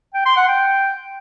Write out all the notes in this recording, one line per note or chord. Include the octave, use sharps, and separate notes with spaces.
G5
C6
F#5
G5